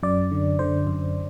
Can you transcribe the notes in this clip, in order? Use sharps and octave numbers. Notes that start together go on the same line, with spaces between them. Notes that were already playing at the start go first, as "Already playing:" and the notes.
F#2 D5
D3
D3 C5
F#2